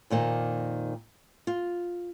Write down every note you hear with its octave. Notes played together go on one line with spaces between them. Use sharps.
F2 A#2 D#3 A#3
F4